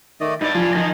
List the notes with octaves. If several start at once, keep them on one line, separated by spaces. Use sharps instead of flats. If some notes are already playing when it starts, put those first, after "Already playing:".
D#3 A3 D5 D#5
G2 D#4 E4 D5
F3 F4 G#5 C6
D#3 F3 D#5